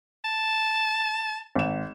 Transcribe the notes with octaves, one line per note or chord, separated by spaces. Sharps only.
A5
G#1 E7